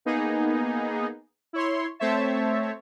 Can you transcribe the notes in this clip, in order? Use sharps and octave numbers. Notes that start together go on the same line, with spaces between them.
A#3 B3 D#4 G#4
E4 C#5 C6
A3 C4 C5 C#5 E5 A5